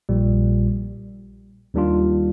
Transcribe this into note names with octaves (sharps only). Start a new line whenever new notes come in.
A#1 A#2 G3
D#2 D#3 G3 D4 F4